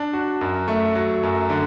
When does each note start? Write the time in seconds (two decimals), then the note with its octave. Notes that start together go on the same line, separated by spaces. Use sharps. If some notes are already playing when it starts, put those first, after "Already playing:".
Already playing: D4
0.13 F#4
0.41 F#2
0.68 A3
0.95 F#3
1.23 F#2
1.50 D3